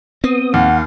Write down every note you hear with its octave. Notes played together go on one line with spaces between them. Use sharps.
B3 C4 D#6
D#2 F5 F#5